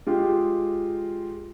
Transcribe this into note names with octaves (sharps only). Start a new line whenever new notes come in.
G#3 F4 G4